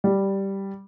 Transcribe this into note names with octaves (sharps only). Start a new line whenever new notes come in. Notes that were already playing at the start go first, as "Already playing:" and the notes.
G3